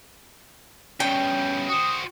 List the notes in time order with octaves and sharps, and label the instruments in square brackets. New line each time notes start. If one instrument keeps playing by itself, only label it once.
[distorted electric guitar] G2 B2 [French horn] C#4 [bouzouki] G5
[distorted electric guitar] F#4 C5 [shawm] D#6